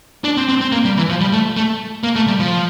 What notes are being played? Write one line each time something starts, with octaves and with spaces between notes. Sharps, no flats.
D4
C4
C4
C4
A#3
G3
E3
F3
G3
A3
A3
A#3
A3
G3
F3